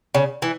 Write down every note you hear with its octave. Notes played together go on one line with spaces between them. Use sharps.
C#3
E3